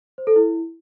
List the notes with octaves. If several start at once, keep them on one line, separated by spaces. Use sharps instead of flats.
C5
A4
E4